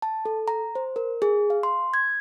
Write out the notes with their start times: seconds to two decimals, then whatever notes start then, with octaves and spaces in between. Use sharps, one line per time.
0.02 A5
0.25 A4
0.48 A#5
0.75 C5
0.96 A#4
1.22 G#4
1.50 F5
1.63 C6
1.94 G#6